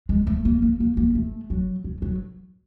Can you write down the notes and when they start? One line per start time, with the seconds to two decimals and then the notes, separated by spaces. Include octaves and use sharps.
0.09 G#3
0.27 A3
0.45 A#3
0.62 A#3
0.80 A#3
0.97 A#3
1.15 A3
1.50 F#3
1.84 F#3
2.02 F#3